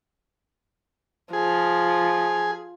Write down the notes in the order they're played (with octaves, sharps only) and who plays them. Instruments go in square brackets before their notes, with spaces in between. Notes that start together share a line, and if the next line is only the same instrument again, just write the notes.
[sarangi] F3 [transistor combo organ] G#4